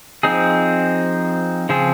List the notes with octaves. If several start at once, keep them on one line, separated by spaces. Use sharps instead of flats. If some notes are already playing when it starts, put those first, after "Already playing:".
F3 C4 D#4 G#4
C#3 F3 C4 F4 G#4